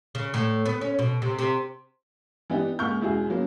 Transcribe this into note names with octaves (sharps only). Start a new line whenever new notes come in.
C#3
A2
B3
C#4
B2
C3
C3
E3 B3 D4 D#4 G4
C#2 A#3 C#6 F6 G6
E1 C#2 E4 F#4 G#4
C#3 F#3 A#3 B3